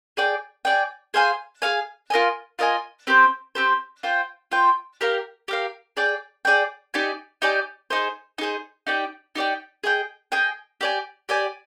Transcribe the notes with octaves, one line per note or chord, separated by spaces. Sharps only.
G#4 D5 G5
G#4 D5 G5
G#4 C5 F5 G#5
G#4 C5 F5 G#5
F4 A#4 D#5 G#5
F4 A#4 D#5 G#5
C4 G4 C5
C4 G4 C5
F4 C5 G5
F4 C5 G5
G4 A#4 F5
G4 A#4 F5
G#4 D5 G5
G#4 D5 G5
D#4 G4 D5 G#5
D#4 G4 D5 G#5
D#4 G#4 C5
D#4 G#4 C5
D#4 G4 D5 G5
D#4 G4 D5 G5
G#4 D#5 G5
G#4 D#5 G5
G4 D5 G#5
G4 D5 G#5